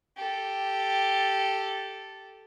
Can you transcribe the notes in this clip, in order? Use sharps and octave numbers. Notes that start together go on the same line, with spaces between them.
G4 A4